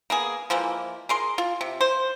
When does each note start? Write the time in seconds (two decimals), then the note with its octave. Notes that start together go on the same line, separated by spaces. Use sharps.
0.10 A#3 B3 G#4
0.50 E3 F3 G#3 A#3
1.09 G#4 A#4 C6
1.38 F4
1.61 C3
1.81 C5